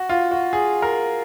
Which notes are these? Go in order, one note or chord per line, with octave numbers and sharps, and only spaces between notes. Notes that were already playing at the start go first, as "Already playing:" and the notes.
Already playing: F#4
F4
F#4
G#4
A#4